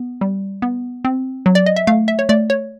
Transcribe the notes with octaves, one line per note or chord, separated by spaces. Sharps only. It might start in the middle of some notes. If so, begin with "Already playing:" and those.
Already playing: B3
G3
B3
C4
F#3
D5
D#5
E5
A3 F5
E5
C#5
A3 D5
C#5